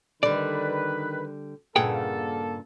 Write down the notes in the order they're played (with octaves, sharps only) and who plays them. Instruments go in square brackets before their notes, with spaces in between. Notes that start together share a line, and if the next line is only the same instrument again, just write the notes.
[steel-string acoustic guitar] D3 G3 [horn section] D#3 B4 [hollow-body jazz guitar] D5
[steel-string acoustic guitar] G2 A#2 C#3 [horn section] A#3 A4 [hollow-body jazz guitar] G#4 F#5 G5